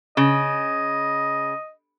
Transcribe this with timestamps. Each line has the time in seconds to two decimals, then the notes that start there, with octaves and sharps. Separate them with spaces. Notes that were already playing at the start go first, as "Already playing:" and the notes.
0.17 C#3 D#5